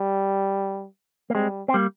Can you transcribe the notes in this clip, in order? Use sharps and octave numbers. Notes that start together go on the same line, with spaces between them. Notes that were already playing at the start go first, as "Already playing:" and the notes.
Already playing: G3
A#3
G3 G#3 C4
C4
G3 A#3